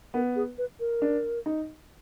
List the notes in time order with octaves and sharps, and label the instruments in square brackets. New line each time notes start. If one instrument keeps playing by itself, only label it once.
[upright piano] B3 [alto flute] A#4
[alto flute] G#4
B4
A#4
[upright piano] D4
D#4